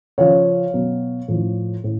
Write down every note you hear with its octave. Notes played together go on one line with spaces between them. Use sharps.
C#3 F3 C#5 F5
B2 F#3
A2 F3
A2